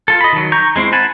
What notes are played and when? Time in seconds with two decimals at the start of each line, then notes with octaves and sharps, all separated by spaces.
0.08 F4 A4
0.21 D#5 B5
0.33 D#3 F#3
0.52 A#5 C#6 G6
0.76 G#3 C4 E4 C5
0.92 F#5 G#5 A5 B5